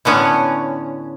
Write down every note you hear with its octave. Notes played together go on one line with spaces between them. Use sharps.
A2 D3 B3 C#4